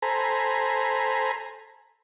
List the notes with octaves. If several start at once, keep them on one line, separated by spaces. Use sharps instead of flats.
A4 C5 G#5 A#5 B5